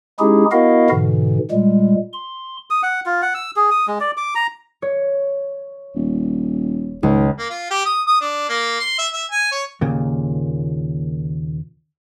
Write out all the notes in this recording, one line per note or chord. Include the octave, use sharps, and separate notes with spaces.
G#3 C#4 D#4 E4 G4 G#4
B3 E4 F#4 A#4 D#5 F5
G#2 B2 D3 E3
A#2 G3 G#3
C6
D#6
F#5
F4
F#5
E6
G#4
D#6
G#3
D5
D6
A#5
C#5
D#1
C#2 G#2
A#3
F4
G4
D#6
D#6
D4
A#3
C6
E5
E5
G#5
C#5
D#2 A#2 C#3